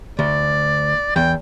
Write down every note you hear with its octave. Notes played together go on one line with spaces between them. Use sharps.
D2 D5
E2 G5